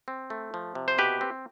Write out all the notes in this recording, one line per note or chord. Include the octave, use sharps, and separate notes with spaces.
C4
A3
F3
C3
C5
B2 G4 B4
C4